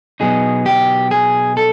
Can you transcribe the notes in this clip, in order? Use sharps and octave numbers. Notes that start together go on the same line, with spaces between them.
B2 F#3 B3 D#4 G#4
G4
G#4
A4